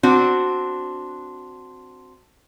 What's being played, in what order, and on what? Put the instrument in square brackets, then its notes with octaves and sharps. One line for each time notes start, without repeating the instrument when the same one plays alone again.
[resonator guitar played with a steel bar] C4 D4 F#4